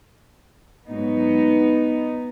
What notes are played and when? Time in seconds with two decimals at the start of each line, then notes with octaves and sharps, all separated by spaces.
0.87 G#2 F#3 B3 D#4